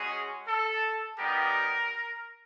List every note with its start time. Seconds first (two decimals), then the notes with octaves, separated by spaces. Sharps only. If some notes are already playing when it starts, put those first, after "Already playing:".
Already playing: G#3 C#4 F#4 G#4
0.47 A4
1.18 G3 B3 D#4 G4 A#4